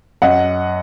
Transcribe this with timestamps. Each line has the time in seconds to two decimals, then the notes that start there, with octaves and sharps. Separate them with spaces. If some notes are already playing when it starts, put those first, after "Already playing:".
0.22 F#2 D#5 F#5